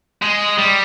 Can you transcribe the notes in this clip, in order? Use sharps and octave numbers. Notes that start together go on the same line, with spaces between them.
G#3
G3